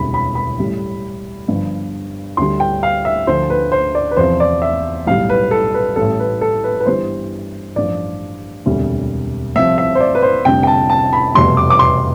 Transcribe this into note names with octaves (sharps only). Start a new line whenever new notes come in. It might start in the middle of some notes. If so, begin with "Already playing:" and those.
Already playing: E1 D2 C3 E3 G3 B5
B5
B5
A1 A2 G3
G1 G2 F3
D2 D3 G3 C6
G5
F5
E5
D2 D3 F3 C5
B4
C5
D5
B4
E2 C3 F3 C5
D5
E5
B1 A2 G3 F5
B4
A4
B4
A1 A2 G3 A4
B4
A4
B4
B4
G1 G2 E3 G3 C5
A1 G2 F3 D5
E1 D2 C3 G3
C2 C3 F3 E5
E5
C5
D5
B4
C5
F1 F2 D3 G3 G5
G5
A5
A5
B5
F1 E2 B2 G3 C6
D6
D6
C6